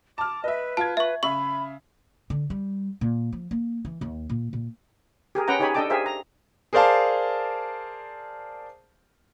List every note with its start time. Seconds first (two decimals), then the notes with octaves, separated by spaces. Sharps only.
0.18 A5 D6 F6
0.44 B4 D#5 E5
0.77 F4 A5 G#6
0.97 B4 E5 C#6
1.23 C#3 E5 B5 C#6
2.30 D3
2.50 G3
3.01 A#2
3.32 F3
3.51 A#3
3.85 E3
4.01 D#2
4.29 A#2
4.53 A#2
5.35 G4 G#4 A#4
5.48 C#4 B4 F#5 G5 A#5
5.60 D#4 G4 G#4 C#5 G#5 B5
5.74 D4 A4 D#5 G5 A5 D6
5.90 G4 G#4 A#4 C5 E5 F5
6.06 A#5
6.73 G#4 A#4 C5 D5 F5 A5